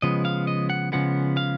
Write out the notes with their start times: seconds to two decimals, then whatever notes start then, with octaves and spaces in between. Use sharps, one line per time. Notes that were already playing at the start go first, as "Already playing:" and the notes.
0.02 C#3 F3 G#3 B3 D#5
0.25 F5
0.47 D#5
0.70 F#5
0.92 C#3 F3 G#3 B3 F#5
1.37 F5